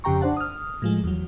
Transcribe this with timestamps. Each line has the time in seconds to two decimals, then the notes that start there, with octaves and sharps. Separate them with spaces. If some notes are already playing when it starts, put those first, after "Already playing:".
0.04 F2 C#3 G4 G5 A#5 C#6
0.21 D4 C5 F#5 A5
0.37 D#6 F6
0.82 A2 F3 G#3
1.04 E2 F#3